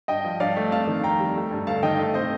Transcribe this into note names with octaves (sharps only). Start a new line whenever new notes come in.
G2 D#5 G5
F3
G2 D5 F5
A3
F2 F5 A5
D#3
F2 G5 A#5
G3
A3
G2
G1 F5 A5
D#3 D#5 G5
A3
C3 C5 D#5